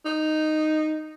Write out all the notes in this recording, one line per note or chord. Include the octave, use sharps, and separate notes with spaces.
D#4